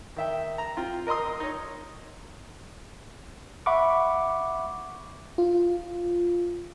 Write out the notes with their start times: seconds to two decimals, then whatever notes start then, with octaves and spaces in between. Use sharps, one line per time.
0.16 D#3 E5 G5
0.58 A#5
0.77 C4 F4
1.07 A#4 D#5 A#5 C6 D#6
1.40 D#4 C#5
3.66 E5 F#5 B5 C#6 D6
5.38 F4